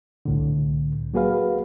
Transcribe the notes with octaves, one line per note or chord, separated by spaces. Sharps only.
C2 A2 D3
F#3 A#3 F#4 G#4 B4 F5